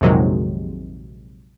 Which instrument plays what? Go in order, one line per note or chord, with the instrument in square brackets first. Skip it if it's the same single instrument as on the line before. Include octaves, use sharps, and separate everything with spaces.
[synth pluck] A#1 F2 C3 D#3 F#3 G#3